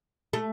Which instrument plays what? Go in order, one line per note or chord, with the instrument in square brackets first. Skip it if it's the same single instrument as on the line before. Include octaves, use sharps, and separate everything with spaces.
[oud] A3